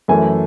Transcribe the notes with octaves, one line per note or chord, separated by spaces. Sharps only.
F#2 E3 A3 G#5